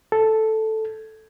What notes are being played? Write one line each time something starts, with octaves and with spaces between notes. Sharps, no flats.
A4